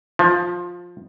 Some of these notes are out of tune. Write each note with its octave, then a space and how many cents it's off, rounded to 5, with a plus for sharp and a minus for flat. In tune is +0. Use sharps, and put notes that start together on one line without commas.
F3 +15